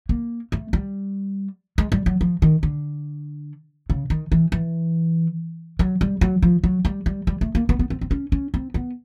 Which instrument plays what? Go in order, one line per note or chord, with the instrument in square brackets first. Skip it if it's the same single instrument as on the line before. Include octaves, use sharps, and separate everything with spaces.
[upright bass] A#3
A3
G3
G#3
G3
F#3
F3
D#3
D3
C#3
D#3
E3
E3
F#3
G3
F#3
F3
F#3
G3
G3
G3
A3
A#3
B3
B3
C4
C4
C#4
C#4
C4
B3